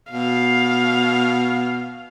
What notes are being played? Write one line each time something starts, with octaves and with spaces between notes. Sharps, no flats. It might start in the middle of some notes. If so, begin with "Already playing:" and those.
B2 F5